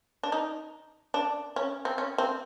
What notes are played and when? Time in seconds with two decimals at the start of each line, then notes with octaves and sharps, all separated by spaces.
0.23 D4
0.32 D#4
1.14 D4
1.56 C#4
1.85 C4
1.98 C#4
2.18 C4